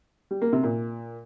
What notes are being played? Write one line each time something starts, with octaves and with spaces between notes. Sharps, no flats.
G3
A#3
C3
A#2